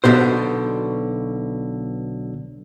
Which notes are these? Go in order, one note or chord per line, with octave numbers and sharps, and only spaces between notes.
B1 F2 B2 D3 C5